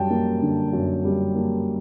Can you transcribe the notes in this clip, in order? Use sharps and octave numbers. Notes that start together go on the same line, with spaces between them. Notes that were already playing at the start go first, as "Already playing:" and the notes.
Already playing: F#2 G3 G5 A5
A#3
D3
F#2
G3
A#3